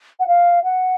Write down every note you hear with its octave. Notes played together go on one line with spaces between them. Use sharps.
F#5
F5
F#5